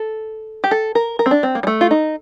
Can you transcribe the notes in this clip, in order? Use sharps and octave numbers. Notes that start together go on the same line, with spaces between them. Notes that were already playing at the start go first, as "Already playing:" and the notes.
Already playing: A4
G4
A4
A#4
A#4
C4
D4
C4
A#3
G3
A3
F4
D#4